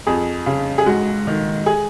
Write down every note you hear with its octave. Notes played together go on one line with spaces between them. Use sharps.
F2 G#4
C#3
G#4
G#2 F#4
D#3
G#4